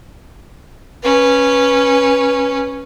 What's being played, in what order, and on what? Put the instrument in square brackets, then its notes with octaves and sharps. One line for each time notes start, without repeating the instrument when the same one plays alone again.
[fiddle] C#4 B4